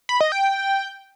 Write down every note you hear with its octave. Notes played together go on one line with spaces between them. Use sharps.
B5
D#5
G5